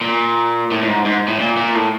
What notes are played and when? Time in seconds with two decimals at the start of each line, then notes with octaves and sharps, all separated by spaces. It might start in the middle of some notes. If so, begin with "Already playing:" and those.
0.01 A#2
0.71 A2
0.83 A2
0.88 G#2
1.06 G#2
1.28 A2
1.39 A#2
1.57 A#2
1.75 A2